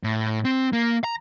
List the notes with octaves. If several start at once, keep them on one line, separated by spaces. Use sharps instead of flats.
A2
C4
A#3
A#5